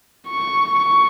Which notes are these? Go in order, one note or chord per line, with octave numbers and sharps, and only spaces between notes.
C#6
C#6